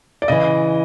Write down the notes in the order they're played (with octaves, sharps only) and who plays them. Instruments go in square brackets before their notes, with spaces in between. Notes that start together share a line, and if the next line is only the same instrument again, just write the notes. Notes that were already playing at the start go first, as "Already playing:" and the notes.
[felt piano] D5
[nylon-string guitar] C#3 E3 [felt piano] D#5